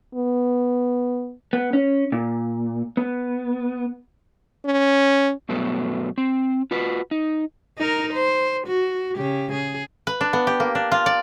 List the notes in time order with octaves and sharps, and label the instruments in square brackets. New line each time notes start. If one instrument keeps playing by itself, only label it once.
[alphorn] B3
[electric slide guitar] B3
C#4
A#2
B3
[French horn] C#4
[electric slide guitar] G2 B2 F#3 A3 B3
C4
F4 F#4 B4
D#4
[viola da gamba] D#4 A#4
C5
F#4
C#3 G4
G#4
[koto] B4
D4
B3
G4
A#3
D4
F4
D5